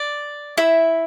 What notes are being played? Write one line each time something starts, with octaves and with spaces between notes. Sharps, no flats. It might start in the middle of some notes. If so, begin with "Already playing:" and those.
Already playing: D5
E4 E5